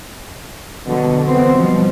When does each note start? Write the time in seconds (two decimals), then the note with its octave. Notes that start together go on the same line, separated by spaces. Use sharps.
0.86 B2 D3 F#3
1.26 E3 B3 C4 C5
1.55 B2 F3 G3